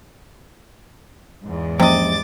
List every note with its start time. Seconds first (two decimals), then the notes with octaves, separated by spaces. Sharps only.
1.43 E2 G#2
1.80 C3 F3 A#3 C#4 D#5 D6 A6